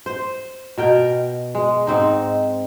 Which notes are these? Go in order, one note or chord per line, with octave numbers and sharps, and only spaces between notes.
C5
B2 A#4 G5
G#3
G#2 C4 D#4